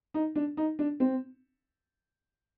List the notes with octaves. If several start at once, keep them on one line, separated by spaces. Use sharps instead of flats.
D#4
D4
D#4
D4
C4